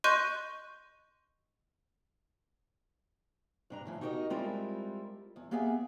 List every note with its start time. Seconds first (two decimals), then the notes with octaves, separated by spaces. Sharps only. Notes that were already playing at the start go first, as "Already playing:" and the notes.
0.04 D#5 C6 C#6 F#6 G6 D#7
3.70 G2 D4 A#5
3.85 A2 E3 F3
4.01 D#4 F#4 G4 A4 A#4 D#5
4.30 G3 G#3 C4 E4 F4 A#4
5.36 E2
5.51 A#3 B3 G4 G#4 E5 G#5